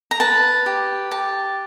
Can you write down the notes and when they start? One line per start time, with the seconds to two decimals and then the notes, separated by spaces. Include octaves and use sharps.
0.11 A#5
0.20 B4 A5
0.66 G4
1.11 G4 A5